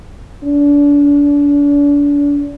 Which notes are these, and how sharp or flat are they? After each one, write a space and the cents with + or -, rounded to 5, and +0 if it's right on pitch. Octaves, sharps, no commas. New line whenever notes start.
D4 -35